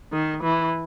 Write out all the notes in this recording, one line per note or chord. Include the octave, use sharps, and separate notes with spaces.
D#3
E3